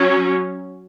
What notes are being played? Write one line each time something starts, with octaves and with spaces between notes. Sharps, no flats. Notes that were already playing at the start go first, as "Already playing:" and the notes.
Already playing: F#3 C#4